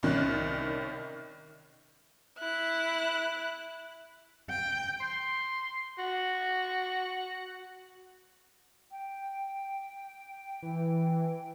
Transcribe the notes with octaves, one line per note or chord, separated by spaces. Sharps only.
C2 D#3 C#4 F#6
E4 F#6
G5
C6
F#4
G5
E3